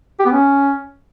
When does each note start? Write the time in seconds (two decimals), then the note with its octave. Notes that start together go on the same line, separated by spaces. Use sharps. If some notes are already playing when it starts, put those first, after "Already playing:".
0.19 G4
0.26 B3
0.32 C#4